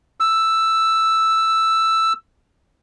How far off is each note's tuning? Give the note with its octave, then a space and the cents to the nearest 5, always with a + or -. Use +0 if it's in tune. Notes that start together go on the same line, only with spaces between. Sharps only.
E6 +5